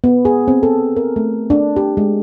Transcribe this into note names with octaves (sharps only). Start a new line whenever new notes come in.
B3
G#4
C4
A4
A#4
A3
D4
G4
G#3